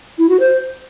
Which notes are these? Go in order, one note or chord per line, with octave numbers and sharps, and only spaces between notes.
E4
F#4
C5